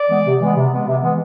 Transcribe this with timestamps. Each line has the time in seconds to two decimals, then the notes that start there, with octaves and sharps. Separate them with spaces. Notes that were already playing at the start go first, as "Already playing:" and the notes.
Already playing: D5
0.09 E3 G#3 B3
0.25 C3
0.39 E3 G#3 B3
0.55 C3
0.71 E3 G#3 B3
0.87 C3
1.02 E3 G#3 B3